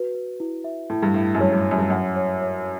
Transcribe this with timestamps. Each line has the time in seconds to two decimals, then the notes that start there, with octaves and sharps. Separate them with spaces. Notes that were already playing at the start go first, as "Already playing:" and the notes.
Already playing: F#4 B4
0.15 B4
0.40 E4
0.64 E5
0.90 A2 A5
1.02 G2
1.14 A2 E5
1.35 F#2
1.40 G2 C#5
1.53 G2
1.66 C#5
1.71 F#2
1.78 G2
1.90 F#2 F#5
2.16 C#5
2.41 C#5